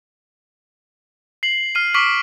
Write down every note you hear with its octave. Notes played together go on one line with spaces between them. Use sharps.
C7 F#7
F6 C7 D#7
C#6 D6 F6 B6 D7 F#7